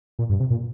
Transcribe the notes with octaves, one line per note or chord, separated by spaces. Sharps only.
A#2
G2
C3
A#2